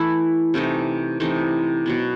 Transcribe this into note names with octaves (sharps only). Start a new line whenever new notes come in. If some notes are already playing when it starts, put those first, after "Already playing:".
Already playing: E3 A3 E4
C3 E3 A3 D#4
C3 E3 A3 D#4
B2 F#3 B3